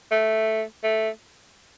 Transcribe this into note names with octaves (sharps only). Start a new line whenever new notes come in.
A3
A3